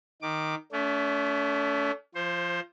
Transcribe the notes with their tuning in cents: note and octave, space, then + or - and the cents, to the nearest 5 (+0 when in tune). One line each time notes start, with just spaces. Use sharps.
D#3 +0 D6 +10
A3 +0 C#4 +45
F3 -15 C5 +15